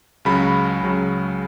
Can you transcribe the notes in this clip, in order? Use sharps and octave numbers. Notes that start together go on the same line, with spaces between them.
C#2 C#3 F#3 B5
C#2 C#3 F#3